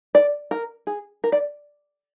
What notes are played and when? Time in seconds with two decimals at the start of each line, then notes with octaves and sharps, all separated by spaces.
0.15 D5
0.51 A#4
0.87 G#4
1.24 A#4
1.32 D5